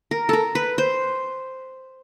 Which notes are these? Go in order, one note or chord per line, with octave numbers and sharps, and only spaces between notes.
A#4
A4 A#4
B4
C5